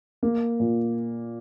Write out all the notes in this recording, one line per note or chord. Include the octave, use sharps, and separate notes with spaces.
A#3
A#2